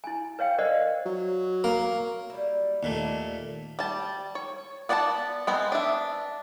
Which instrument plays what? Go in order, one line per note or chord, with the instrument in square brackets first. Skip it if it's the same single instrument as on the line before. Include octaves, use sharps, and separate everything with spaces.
[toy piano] E4 G#5
B4 C#5 F5 G5
A#4 C5 D5 D#5 F#5
[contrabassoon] F#3
[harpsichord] A#3
[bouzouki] G3 E4
[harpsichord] D#2 A#2 A3 [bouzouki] A4
[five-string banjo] G3 A5
C#5
B3 D5 F#5 G5 A5
G#3 B3 C4
D4 E5